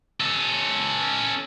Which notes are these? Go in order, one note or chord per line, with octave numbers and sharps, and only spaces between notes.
C#4 A4